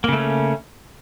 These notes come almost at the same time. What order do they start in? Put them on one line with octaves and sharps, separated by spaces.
A#3 C#3 A3 C#4